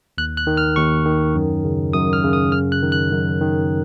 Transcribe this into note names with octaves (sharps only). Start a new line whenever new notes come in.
D#2 F#6
F#6
D#3
F6
D#2 C#6
D#3
F#2
C#3
F#2 D#6
F6
C#3
D#6
F#2 F6
F#6
D#3
F#6
F#2
D#3